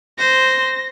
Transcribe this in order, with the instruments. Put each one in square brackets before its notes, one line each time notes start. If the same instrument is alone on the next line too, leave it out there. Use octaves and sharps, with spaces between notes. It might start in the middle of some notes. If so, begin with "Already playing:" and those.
[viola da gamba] C5 [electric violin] A#6